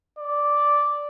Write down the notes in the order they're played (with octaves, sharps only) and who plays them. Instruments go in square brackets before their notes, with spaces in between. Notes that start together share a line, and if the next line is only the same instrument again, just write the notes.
[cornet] D5